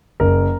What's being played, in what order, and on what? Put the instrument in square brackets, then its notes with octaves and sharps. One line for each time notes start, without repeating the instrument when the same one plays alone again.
[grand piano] F#1 A#4